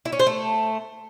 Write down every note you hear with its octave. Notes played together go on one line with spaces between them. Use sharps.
E4
C#4
C5
A3